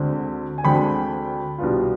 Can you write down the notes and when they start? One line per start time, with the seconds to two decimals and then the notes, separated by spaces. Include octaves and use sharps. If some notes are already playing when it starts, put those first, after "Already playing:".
Already playing: D2 D3 G#3 C4
0.58 G#5
0.64 D2 D3 G#3 C4 G5 B5
1.58 C2 B2 B3 D4 F4